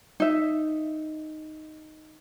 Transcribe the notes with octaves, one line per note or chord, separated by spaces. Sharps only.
D#4 E5